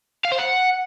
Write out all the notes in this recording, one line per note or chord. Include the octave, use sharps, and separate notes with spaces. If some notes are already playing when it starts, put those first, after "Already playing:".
F5
C5
F#5